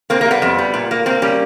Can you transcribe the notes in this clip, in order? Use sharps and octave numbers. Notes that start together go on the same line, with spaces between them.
A#3 C4
A#3
G3
B3
F2
G3
A#2
A#3
A#3 C4
G3 C#4